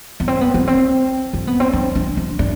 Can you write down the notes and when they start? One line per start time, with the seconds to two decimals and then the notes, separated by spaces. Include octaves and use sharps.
0.20 B3
0.28 C4
0.41 B3
0.54 B3
0.67 C4
1.34 C4
1.47 B3
1.60 C4
1.73 D4
1.95 D4
2.17 D4
2.39 D4